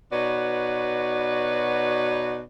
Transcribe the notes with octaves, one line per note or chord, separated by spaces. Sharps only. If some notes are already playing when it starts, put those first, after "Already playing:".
B2 D#4 F#4 B4 C#5 D5